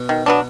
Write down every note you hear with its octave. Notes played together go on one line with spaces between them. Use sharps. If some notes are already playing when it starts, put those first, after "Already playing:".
Already playing: B2
D#3
F#3 B3 D4